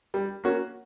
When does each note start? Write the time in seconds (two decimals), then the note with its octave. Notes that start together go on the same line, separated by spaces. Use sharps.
0.14 G3
0.44 A#3 C#4 F#4